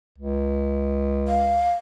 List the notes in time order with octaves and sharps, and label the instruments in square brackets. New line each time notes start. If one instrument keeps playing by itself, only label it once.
[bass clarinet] C#2
[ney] F5